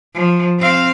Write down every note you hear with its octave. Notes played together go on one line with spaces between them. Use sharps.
F3
C4 F5